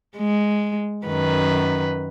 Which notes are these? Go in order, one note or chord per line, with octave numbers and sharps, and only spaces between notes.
G#3
F#2 D#3 B4